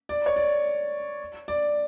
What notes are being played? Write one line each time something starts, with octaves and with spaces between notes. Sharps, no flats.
D5
C#5
D5
D5